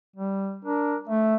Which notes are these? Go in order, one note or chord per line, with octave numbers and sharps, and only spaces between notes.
G3
D4 A#4
A3 E5